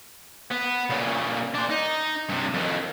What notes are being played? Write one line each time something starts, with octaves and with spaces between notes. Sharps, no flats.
B3
A#2 C#3
D4 C5
D#4
G2 C3
F2 D#3